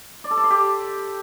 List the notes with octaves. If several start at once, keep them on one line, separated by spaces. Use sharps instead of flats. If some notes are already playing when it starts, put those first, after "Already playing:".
D5
A4
D5
C6
G4